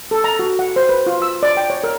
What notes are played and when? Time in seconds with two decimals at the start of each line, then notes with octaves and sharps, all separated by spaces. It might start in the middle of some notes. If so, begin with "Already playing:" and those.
0.11 A4
0.24 A#5
0.39 F#4
0.59 F#5
0.76 C5
0.89 B4
1.06 F4
1.22 E6
1.43 D5
1.57 G5
1.70 C#5
1.84 A#4